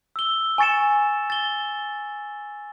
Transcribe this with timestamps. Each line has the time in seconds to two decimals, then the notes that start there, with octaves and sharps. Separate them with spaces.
0.16 E6 G7
0.58 G#5 C#6 A6 C#7 E7
1.30 A6 G7